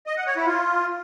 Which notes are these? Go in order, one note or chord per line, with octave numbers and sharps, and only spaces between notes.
D#5
F#5
C#5
E4
F4